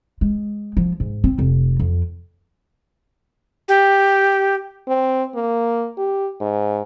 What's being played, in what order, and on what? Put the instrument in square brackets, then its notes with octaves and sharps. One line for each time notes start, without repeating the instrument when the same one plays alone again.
[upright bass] G#3
F3
G#2
C4
F1
F2
[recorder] G4
[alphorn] C4
A#3
G4
G#2